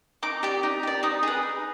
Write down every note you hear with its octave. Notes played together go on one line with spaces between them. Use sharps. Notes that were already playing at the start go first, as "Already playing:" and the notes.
D#4 D6
G4 D5
D#4
G4 D5
D#4 D#6
G#4 B4
D#4